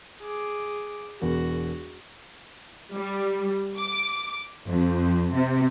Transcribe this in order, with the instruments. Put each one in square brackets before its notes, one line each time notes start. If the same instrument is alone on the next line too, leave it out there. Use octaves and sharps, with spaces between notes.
[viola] G#4 D6
[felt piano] E1 E2 A#4 [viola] F#4
[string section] G3
D6
F2
C3